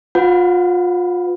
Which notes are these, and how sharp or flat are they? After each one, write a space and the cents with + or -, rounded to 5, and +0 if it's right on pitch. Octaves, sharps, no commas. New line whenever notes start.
F4 +30 B4 +35 F#5 +0